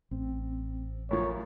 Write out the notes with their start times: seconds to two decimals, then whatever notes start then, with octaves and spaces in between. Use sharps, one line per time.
0.11 A1 C4
1.11 F#2 A2 F3 C#5